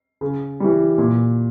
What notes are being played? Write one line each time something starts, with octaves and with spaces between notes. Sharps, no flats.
C#3
E3 G3
A#2